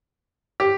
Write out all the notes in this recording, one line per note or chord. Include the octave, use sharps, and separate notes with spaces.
G4